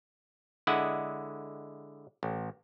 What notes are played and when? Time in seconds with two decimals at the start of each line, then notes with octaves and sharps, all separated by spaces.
0.67 D3 G#3 E4 D#5 F#5
2.23 A1